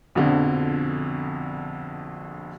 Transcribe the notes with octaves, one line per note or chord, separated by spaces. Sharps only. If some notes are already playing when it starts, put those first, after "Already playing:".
A#1 F2 B2 D3